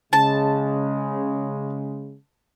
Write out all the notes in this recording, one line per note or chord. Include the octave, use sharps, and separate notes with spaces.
C#3 G#3 A5